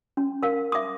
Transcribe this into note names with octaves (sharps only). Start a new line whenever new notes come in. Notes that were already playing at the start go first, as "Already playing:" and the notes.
C#4
A#4 F5
E5 D6 D#6